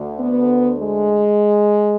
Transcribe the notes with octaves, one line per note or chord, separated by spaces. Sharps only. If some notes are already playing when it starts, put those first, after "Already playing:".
Already playing: D2 D3
B3
G#3